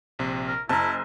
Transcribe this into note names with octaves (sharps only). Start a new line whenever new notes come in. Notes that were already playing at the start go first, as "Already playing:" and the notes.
A#1 C3
A#4
F#1 E4 A5 A#5